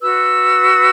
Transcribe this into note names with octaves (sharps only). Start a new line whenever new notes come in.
F#4 B4 E6